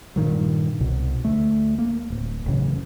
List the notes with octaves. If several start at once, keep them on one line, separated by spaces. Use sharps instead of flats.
G2 A#2 D#3 F#3
C2 B2
D2 A3
A#3
D1
A1 F#2 C#3 E3